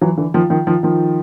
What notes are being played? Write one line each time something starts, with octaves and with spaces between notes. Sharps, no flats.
E3 F#3
D3 E3
D#3 F3
D#3 F3
D#3 F3
D#3 F3